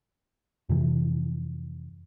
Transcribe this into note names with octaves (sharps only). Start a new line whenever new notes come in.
F2 C3 E3